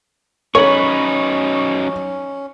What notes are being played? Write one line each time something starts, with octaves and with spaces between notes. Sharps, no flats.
F#2 C#4 D#4 C#5 B5 C#6